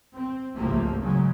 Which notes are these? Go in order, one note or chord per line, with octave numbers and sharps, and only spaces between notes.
C4
G#1 C#2 C3 F3 A3 A#3
G#2 C#3 F#3 G#3